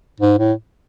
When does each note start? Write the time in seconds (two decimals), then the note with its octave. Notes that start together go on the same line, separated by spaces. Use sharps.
0.20 G#2
0.39 A2